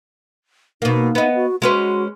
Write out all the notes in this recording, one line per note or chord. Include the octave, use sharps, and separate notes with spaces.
B2 A#3 D#4
B3 D#5
F#4
G#3 C#4 F#4 B4